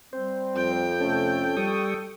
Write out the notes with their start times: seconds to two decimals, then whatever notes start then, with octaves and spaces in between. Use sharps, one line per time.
0.13 G3 C4 C5
0.56 F2 G5
1.00 C3 A3 C#4 A4
1.57 G3 A4 C#6 D#6